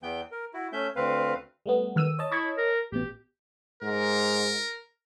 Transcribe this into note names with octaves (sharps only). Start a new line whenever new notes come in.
E2 E3 B3 G5 G6
A#4
E4 F#4
A3 C#4 E5 G6
D2 C4 B4 F5
G3 A3 B3
D#3 E6 D#7
C#5 D#5 A5
E4 C#6 G#6
A#4
A1 B2 G4
G#2 A#4